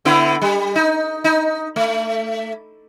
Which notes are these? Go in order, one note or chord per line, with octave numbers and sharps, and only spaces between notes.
D3 B3 E4
G3
D#4
D#4
A3